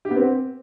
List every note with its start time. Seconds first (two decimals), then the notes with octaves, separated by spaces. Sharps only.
0.05 G4
0.11 B3
0.16 C4